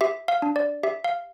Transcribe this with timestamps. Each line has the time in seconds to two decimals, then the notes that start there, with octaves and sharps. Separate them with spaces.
0.01 G4 E5
0.28 F5
0.42 D4
0.56 D5
0.83 G4 E5
1.04 F5